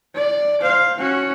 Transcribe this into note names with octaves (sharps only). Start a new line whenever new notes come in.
D5
C5 F5
C#4 F#4